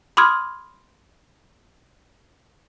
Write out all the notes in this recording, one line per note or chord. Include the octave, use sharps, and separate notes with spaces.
B5 C6 D6 D#6 F6 G#6